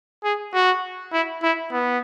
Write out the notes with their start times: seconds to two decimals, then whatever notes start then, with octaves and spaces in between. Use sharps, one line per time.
0.24 G#4
0.54 F#4
1.13 E4
1.43 E4
1.72 B3